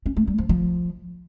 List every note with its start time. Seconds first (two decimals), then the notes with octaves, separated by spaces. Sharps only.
0.06 C#4
0.17 A3
0.27 G3
0.38 F3
0.49 F3